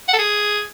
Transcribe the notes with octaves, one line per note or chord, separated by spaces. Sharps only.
F#5
A4
G#4